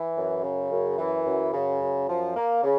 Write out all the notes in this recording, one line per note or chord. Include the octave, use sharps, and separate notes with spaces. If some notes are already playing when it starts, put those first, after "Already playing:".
Already playing: E3
F#2
C#3
F#2
E3
F#2
C#3
F#2
F3
A#3
C#3